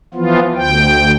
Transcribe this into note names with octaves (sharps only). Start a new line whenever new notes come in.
E3 F3 B3 F4
D2 G5